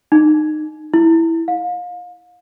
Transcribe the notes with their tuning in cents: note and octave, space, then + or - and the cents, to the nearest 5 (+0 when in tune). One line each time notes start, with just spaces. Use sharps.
D#4 -25
E4 +0
F5 +35